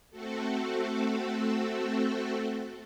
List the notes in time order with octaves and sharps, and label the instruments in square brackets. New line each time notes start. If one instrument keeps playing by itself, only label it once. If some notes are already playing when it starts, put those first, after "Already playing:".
[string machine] A3 C4 F#4 A4